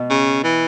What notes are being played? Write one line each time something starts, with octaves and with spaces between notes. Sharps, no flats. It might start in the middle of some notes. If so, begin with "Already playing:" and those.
Already playing: B2
C#3
E3